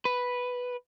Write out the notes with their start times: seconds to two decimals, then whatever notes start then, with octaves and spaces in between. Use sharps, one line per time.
0.05 B4